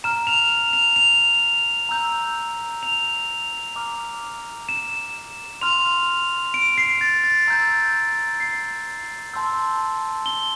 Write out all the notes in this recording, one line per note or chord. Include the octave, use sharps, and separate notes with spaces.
A#5 F6 E7
F7
F7
F7
F7
A#5 E6 G6
F7
A#5 D6 F6
E7
C6 F6 F7
D7
C7
A6
A6
A#5 E6 G6
C7
A5 C6 E6 G6
G7